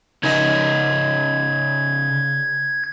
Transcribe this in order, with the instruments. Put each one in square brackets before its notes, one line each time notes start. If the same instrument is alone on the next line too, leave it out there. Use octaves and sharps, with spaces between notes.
[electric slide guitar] C#3 D#4 [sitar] C#4 A#4 D#5 [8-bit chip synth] G#6